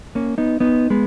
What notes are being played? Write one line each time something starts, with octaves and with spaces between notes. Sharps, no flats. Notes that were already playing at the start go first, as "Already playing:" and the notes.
A#3 C#4
B3 D#4
B3 D#4
G#3 B3